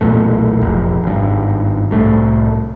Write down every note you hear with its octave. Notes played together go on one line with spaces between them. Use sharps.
B1 E2 A#2 A3
F1 A#1
G#1 G2
C2 A2 A3